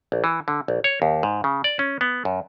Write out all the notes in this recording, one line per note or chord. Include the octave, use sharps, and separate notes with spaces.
A#1
E3
D3
A#1
C#5
D#2
G#2
C#3
D5
C#4
B3
F#2